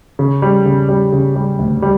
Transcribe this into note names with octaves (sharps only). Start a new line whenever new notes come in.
C#3
G3
C#3
G3
C#3
G3
D2
G3